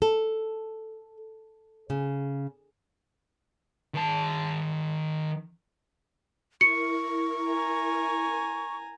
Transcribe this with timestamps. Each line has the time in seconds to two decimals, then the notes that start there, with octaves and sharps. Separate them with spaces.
0.02 A4
1.90 C#3
3.94 D#3 A5
6.61 E4 A#4 C#6 C#7
7.46 G#5 A#5